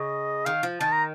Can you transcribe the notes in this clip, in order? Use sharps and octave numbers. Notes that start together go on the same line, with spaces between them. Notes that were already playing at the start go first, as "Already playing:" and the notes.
Already playing: C#3 D#5
D#3 F5
F3
D#3 A5
A#5